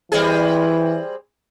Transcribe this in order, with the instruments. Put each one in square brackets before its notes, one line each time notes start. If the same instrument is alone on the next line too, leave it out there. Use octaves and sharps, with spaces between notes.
[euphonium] E3 [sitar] G3 C4 G#4